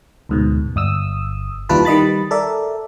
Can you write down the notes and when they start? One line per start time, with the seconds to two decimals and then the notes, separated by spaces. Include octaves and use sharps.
0.29 D2 G#2 B2
0.76 G1 D#6 E6
1.69 D#2 G3 E4 F4 B4 A5
1.85 D#3 G3 D#5 B5 A6
2.31 A4 A#4 D5 E5